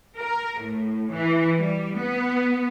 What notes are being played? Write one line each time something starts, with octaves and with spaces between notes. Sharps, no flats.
A#4
A2
E3
G3
B3